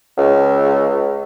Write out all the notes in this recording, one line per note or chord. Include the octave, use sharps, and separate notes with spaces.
C#2